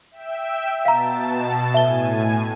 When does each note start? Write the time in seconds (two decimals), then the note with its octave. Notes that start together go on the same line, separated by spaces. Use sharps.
0.11 E5 G5 E6
0.85 B2 F5 A5 A#5
1.74 A2 E5 G#5 G7